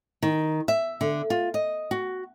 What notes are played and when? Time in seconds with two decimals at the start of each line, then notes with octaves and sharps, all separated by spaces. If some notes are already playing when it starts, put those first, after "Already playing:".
0.23 D#3
0.68 E5
1.01 D3
1.30 F4
1.54 D#5
1.91 F#4